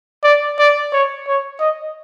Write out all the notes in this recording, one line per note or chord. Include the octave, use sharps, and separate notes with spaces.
D5
D5
C#5
C#5
D#5